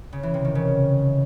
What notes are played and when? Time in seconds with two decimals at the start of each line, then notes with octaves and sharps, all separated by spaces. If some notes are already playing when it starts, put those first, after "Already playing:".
0.13 C#3
0.23 E3
0.34 C3
0.45 D#3
0.55 C#3